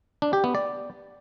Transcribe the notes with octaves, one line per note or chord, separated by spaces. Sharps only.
D4
G4
B3
D5